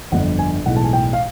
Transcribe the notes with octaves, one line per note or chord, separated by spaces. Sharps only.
G1 F2 D3 F#5
G#5
B1 A2 E3 G#3 F#5
A5
G#5
G5
F5